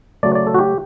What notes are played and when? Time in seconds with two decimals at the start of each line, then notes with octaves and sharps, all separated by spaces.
0.23 C#3 F#3 A3 D5
0.35 D5
0.47 A4
0.54 F#4
0.59 G4